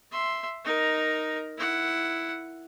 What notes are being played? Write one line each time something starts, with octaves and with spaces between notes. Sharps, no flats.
E5 C6
D#4 A#4
E4 F#5